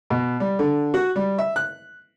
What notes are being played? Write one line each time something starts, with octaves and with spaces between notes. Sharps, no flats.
B2
G3
D3
F#4
G3
E5
F#6